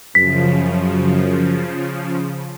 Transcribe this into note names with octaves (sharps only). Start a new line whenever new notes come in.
F#2 C#3 F3 B6